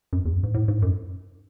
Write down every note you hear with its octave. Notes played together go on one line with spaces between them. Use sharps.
F#2
E2
F#2
G#2
A2
G#2
F#2